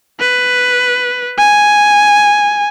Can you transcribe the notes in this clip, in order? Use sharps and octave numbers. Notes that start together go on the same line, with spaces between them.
B4
G#5